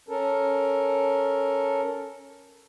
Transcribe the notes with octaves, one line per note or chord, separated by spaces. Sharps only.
C#4 A4 A#4